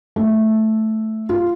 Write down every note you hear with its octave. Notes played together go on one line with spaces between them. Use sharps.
A3
F4